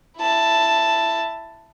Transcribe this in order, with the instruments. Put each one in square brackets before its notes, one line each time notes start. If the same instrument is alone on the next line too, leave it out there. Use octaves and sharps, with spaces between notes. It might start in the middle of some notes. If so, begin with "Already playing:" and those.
[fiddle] E4 A5